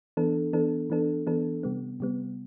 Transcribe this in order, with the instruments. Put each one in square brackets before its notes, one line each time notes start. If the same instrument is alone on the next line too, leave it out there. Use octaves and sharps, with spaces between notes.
[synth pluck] E3 B3 D4 A4
E3 B3 D4 A4
E3 B3 D4 A4
E3 B3 D4 A4
C3 G3 B3
C3 G3 B3